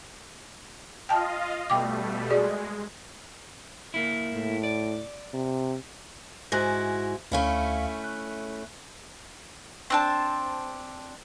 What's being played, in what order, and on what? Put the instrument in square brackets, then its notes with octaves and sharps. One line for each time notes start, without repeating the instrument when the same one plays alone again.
[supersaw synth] F4 D#5 F5 [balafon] G5 A5
[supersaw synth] B2 G3 A3 [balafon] G5 D6
[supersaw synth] G#3 [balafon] F#4 G#4 D5
[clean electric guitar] A#3 E4
[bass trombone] A2
[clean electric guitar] D5
[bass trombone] C3
[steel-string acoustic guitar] G#2 E4 F#4 [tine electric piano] G#5 F#6 A#6
[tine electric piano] D2 F5 B5 [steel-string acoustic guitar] A3 C#4 E4
[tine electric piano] F#6
[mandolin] C4 D4 A5